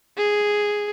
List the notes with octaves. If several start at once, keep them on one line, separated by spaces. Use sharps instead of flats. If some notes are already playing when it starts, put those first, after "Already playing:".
G#4